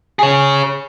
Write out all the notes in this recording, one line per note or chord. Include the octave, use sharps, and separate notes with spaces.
G#4 C#5